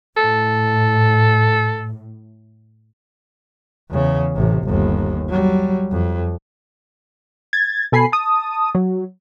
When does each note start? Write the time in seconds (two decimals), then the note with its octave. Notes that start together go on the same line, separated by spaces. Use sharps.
0.17 A2 A4
3.90 E2 C#3
4.35 A1 C3
4.64 G1 D#2
5.29 F#3 G3
5.91 F2
7.53 G#6 A6
7.92 B2 A4 G#5 B5 C7
8.12 A5 D#6
8.75 F#3